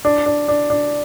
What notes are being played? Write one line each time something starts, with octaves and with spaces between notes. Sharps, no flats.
D4
D4
D4
D4